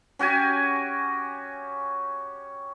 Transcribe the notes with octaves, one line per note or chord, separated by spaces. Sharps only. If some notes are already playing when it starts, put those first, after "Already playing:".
C#4 F#4 G4 G#5